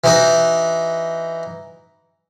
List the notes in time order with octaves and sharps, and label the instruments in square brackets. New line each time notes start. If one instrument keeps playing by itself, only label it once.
[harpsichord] E3 D#4 F#4